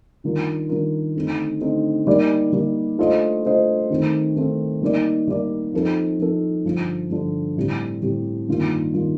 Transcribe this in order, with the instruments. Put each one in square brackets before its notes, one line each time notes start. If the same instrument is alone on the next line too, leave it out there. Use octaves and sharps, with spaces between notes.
[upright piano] D#3 G3 D4 F4 A#4
D#3 G3 D4 F4 A#4
D3 A3 C4 D#4
D3 A3 C4 D#4
G3 A#3 D#4 A#4 D5
G3 A#3 D#4 A#4 D5
A3 D4 F4 C5 D#5
A3 D4 F4 C5 D#5
D#3 A3 C4
D#3 A3 C4
G3 A#3 D#4 A#4 D5
G3 A#3 D#4 A#4 D5
F3 C4 D#4 A4
F3 C4 D#4 A4
G2 D3 F3
G2 D3 F3
A2 G3 C4 G4
A2 G3 C4 G4
G2 D#3 G3 A#3 F4
D#3 G3 A#3 F4